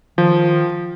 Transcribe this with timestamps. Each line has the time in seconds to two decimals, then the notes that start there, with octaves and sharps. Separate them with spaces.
0.18 D#3 F3